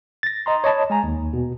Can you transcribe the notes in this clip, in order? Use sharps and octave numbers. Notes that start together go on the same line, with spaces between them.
A6 A#6
D#5 A#5 C6
C#5 D#5 A5 B5
G#3 G#5 A#5
D#2
B2